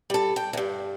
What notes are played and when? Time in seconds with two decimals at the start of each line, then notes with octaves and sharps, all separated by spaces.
0.10 G3 A4
0.36 G5
0.53 E2 G2